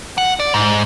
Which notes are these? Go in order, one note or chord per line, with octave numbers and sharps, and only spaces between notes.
F#5
D5
G#2